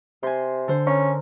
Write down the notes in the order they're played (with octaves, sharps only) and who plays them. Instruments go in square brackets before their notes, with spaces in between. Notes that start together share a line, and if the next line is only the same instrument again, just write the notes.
[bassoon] C3 [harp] G#5 C6
[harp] D3 C5
[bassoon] C#4 [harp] A#4